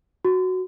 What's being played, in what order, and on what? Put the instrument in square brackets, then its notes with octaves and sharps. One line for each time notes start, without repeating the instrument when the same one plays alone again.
[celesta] F#4